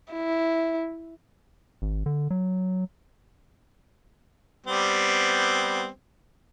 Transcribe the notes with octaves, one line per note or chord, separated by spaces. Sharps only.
E4
G#1
D3
F#3
G3 B3 C4